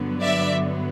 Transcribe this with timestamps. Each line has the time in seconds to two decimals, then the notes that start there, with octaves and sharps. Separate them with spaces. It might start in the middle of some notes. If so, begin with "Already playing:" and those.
Already playing: G2 D3 F#3 B3
0.22 D5 E5